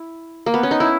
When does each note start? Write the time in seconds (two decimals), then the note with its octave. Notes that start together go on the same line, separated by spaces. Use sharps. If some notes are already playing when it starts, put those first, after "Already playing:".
Already playing: E4
0.46 A#3
0.54 B3
0.63 C#4
0.71 D#4
0.80 E4